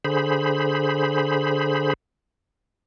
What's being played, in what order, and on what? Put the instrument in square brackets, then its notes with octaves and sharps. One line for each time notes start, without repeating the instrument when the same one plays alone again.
[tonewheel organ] D3 G#4 C5 B5